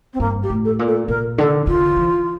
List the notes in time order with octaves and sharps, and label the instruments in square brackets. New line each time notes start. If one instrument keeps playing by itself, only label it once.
[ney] C4
[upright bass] G2 [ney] A#3
[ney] G4
[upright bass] A2
[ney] A4
[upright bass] A#2
[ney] A4
[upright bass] A#2 [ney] A#4
[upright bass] D3 [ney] A4
[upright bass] D3 [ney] F4
[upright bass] E3